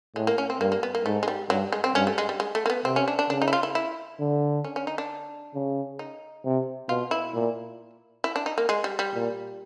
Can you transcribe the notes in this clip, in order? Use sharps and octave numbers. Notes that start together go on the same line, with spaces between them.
A2 G#3
A#3
C#4
C4
G2 A#3
A#3
B3
A#3
G#2 A3
G#3
G3
G2 F#3
G#3
C4
G2 C#4
A3
G#3
G3
G#3
A3
A#3
B3
C3 C4
C#4
D4
D4
C#3 D4
D#4
E4
F4
E4
E4
D3
C#4
C#4
D#4
D4
C#3
D#4
C3
B2 F4
E4
A#2
E4
D4
D#4
A#3
G#3
G3
G3
A#2